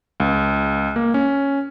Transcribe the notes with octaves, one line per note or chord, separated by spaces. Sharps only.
C#2
A#3
C#4